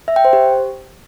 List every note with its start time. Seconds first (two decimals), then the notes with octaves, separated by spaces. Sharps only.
0.08 E5
0.16 G5
0.25 C5
0.33 G4